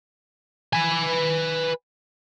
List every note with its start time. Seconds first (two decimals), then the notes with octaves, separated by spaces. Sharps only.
0.73 B4 G#5